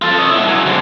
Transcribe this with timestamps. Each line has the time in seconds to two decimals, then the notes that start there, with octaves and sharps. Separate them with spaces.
0.02 F4 A4
0.18 C#5 D#5
0.31 B2 E4
0.48 C#3 F#3
0.66 G#2 D3